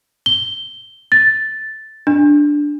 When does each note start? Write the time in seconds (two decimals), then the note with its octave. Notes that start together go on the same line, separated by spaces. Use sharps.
0.26 G7
1.12 A6
2.07 D4